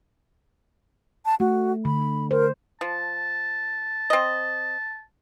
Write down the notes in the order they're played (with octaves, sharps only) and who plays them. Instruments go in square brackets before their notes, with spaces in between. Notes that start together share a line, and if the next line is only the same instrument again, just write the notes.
[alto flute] A5
[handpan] A3 [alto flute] F#4
[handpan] D3 [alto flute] B5
[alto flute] A#4 [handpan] C5
[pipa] F3 [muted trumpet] A5
[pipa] C4 D#5